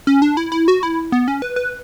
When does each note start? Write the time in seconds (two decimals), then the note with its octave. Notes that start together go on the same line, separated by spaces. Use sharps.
0.07 C#4
0.22 D4
0.37 E4
0.52 E4
0.68 F#4
0.83 E4
1.12 B3
1.28 C#4
1.42 B4
1.56 B4